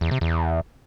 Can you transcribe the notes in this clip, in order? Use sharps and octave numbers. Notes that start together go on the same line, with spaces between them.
E2
C3
E2